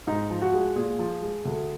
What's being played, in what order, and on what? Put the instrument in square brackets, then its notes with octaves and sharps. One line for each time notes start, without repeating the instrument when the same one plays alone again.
[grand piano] G#2 D#4
F3
F#4
G#3
A#2 G#4
F3
G#3
D2